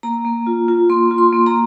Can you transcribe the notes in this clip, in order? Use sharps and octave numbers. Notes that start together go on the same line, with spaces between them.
A#3 A#5
A#3
F4
F4
A#3 C6
F4
C6
A#3
A#5